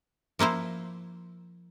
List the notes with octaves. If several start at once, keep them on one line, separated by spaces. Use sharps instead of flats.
F3 A#3 E4 C5